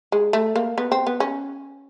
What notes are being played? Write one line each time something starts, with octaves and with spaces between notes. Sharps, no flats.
G#3
A3
A#3
B3
C4
B3
C#4